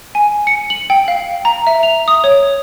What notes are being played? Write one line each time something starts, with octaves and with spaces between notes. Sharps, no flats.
G#5
C#7
F#7
G5
F5
A#5
E5
F7
D#6
C#5